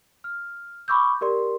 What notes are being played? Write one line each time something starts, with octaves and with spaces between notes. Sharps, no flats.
F6
B5 C#6 D6 E6 G6
G4 A#4 D5 C6